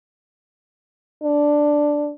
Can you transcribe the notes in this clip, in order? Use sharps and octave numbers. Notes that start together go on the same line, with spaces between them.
D4